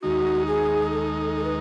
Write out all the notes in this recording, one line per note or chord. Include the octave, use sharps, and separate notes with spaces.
D#2 D#3 G#3 D#4 F#4
G#4
A4
A4
B4